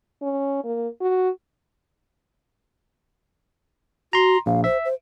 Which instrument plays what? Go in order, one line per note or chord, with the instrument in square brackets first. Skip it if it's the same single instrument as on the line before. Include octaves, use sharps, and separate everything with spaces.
[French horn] C#4
A#3
F#4
[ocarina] F#4 [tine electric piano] A#5 C6
[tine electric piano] A#1 [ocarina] F5
[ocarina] C5 [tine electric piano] E5
[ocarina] C5